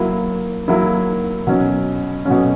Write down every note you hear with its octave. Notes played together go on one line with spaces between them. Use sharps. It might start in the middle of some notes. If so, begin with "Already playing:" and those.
Already playing: F#3 A#3 E4
F#3 A#3 E4
B2 F#3 C#4
B2 F#3 C#4